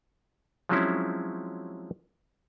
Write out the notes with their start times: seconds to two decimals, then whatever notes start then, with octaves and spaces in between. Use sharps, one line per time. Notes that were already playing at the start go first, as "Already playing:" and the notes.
0.69 F3 F#3 G#3 C4 C#4 E4